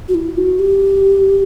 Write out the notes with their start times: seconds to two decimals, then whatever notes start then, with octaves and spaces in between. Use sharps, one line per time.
0.09 F#4
0.15 E4
0.38 F#4
0.59 G4